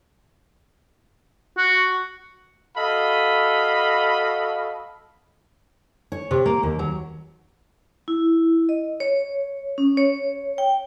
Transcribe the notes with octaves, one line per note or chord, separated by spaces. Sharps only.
F#4
F#4 A4 D#5 F5 B5
C#5
C3
A#3
D#2
F#3
E4
D#5
C#5
C#4
C#5
G5